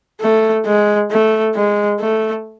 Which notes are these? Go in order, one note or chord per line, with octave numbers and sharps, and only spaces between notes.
A3
G#3
A3
G#3
A3